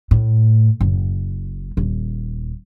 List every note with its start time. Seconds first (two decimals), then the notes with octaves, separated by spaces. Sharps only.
0.11 A2
0.81 F#1
1.77 D#1